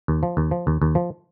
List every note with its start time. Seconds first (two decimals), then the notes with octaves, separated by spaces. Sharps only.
0.08 D#2
0.23 F3
0.37 D#2
0.51 F3
0.67 D#2
0.82 D#2
0.95 F3